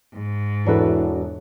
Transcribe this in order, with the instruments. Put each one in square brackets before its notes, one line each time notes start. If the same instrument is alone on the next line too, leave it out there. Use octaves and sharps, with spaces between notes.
[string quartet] G#2
[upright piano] E1 A4 [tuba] E3 [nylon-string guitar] D4 F#4 B4